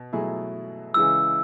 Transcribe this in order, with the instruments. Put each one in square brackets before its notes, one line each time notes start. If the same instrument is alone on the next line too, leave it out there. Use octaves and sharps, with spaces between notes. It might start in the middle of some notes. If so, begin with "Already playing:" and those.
Already playing: [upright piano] B2
B2 F#3 A3 E4 G#4
[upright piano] C#3 E3 G#3 [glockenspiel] E6